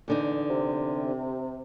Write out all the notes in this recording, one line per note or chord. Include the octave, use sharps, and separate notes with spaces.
E2 D3 D#4
C3